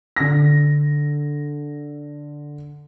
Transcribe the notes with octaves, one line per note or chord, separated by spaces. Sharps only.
D3 A#6